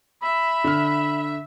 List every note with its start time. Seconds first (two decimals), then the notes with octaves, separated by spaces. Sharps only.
0.22 E5 B5
0.64 D3 F6